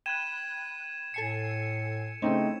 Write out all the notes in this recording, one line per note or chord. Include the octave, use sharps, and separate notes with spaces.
G5 B5 F#6 G#6 D#7 E7
A2 A4 G#5 C7 C#7
C#3 A3 C4 C#4 D#4 E4 G5